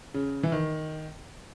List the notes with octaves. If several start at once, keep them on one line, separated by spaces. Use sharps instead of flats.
C#3
E3
D#3